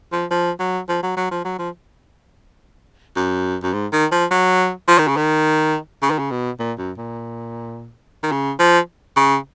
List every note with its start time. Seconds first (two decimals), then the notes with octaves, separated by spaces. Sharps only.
0.12 F3
0.31 F3
0.60 F#3
0.89 F3
1.03 F#3
1.17 F#3
1.31 F3
1.45 F#3
1.59 F3
3.16 F#2
3.63 F#2
3.73 G#2
3.93 D#3
4.12 F3
4.31 F#3
4.88 F3
4.98 D#3
5.08 C#3
5.17 D#3
6.02 C#3
6.11 D#3
6.19 C#3
6.31 B2
6.59 A#2
6.78 F#2
6.98 A#2
8.23 D#3
8.32 C#3
8.59 F3
9.16 C#3